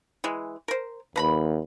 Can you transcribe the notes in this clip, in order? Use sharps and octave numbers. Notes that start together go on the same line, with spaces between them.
E3 G#3
A#4 C5
D#2 B4 A#5 B5